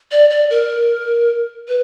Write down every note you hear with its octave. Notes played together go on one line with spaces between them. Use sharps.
D5
D5
A#4
B4